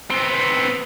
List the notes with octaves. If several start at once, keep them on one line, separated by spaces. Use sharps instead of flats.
B3 C4